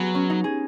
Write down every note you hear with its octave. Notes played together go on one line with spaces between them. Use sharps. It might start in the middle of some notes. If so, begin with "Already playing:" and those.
Already playing: F#3 B3 G#4
C#4
D#4
G#4